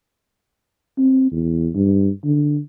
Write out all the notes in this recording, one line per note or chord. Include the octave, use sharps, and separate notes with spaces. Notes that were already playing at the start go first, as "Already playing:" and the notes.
C4
E2
G2
D3